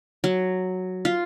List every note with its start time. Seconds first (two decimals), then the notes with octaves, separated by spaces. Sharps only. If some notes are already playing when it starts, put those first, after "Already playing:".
0.24 F#3
1.05 F4